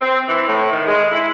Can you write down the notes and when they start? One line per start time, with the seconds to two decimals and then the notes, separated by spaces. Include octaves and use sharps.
0.01 C4
0.28 E3
0.48 A2
0.71 D#3
0.86 G#3
1.11 E4